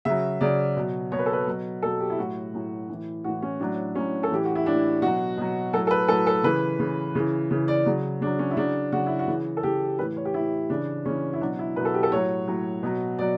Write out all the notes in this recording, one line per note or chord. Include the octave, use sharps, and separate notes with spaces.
C#3 F#3 E5
C#3 F#3 D5
B2 F#3
B2 F#3 C#5
B4
A4
B4
B2 F#3
B2 F#3 A4
G4
E4
A2 F#3 F#4
A2 F#3
A2 E3
A2 E3 F#4
C#4
A2 F#3 D4
A2 F#3 C#4
A4
A2 E3 G4
F#4
E4
A2 E3 D4
B2 F#3 F#4
B2 F#3
A2 F#3 A4
A4
B4
A2 F#3 A4
A4
C#3 E3 B4
C#3 E3
C#3 E3
C#3 E3
D5
C#3 F#3
C#3 F#3 D4
C#4
E4
C#3 F#3 D4
C#3 F#3 F#4
E4
F#4
C#3 E3
A4
C#3 E3 G4
A2 E3 B4
C#5
G4
A2 E3 E4
C#3 E3 D4
C#3 E3 C#4
E4
B2 F#3 D4
E4
B2 F#3 B4
A4
G4
A4
A2 F#3 C#5
A2 F#3
B2 F#3
B2 F#3 D5